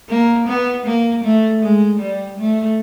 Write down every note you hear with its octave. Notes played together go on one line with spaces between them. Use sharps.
A#3
B3
A#3
A3
G#3
G3
A3